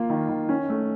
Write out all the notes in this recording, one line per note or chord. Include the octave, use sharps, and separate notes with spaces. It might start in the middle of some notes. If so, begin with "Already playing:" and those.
Already playing: A#3 F4
D#3
D#3
C#4
A3